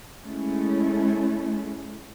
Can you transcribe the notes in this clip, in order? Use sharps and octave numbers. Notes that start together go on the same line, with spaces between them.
G#3 A3 C#4 E4